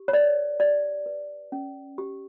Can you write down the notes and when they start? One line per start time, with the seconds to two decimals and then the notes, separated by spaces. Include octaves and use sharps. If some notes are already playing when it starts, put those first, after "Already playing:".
Already playing: G4
0.08 C#5
0.13 B4 D5
0.60 G4 D5
1.06 B4
1.52 C#4
1.98 G4